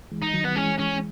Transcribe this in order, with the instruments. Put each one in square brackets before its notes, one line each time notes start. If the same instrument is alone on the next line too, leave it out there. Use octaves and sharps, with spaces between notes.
[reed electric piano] E3 G#3
[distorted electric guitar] D#4
[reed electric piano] D#3 F#3
[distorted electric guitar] B3
[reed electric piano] E3 G#3 [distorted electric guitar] C#4
[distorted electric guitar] C#4